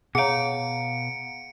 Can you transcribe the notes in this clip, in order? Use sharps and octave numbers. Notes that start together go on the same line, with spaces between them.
B2 G#4 C#5 F5 F#5 A#5 C#7 D7